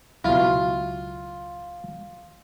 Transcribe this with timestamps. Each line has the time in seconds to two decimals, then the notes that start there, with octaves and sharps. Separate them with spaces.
0.24 C#2 B2 F#3 E4 F4